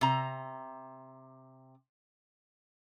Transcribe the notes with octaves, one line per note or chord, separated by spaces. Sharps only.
C3 A#5